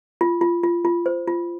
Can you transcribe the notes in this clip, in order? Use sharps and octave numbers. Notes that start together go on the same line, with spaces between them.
F4
F4
F4
F4
C5
F4